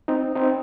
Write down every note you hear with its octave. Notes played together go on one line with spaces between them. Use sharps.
C4 D#4
C4 D#4